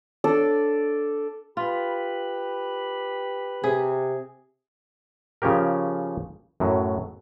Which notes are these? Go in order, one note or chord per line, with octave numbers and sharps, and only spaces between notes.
D4 A4 D5
F4 G4 B4 B5
C3 G#4
C#3 F3 C#4 G4 A#4
F#2 A2 F#3